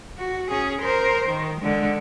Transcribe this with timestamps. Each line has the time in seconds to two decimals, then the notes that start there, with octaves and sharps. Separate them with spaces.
0.18 F#4
0.50 C#4 G#4
0.81 A#4 C5
1.29 D#3
1.60 D3 G#3